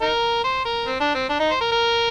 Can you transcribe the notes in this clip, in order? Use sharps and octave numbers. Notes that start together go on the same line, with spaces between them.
D#4 A#4
C5
A#4
C4
D4
C4
D4
D#4
C5
A#4
A#4